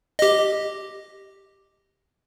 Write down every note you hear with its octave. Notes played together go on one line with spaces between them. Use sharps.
G4 D#5